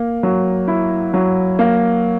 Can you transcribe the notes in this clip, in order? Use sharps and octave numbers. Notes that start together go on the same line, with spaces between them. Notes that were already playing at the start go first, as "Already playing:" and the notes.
Already playing: A#3
F#3
E4
F#3
A#3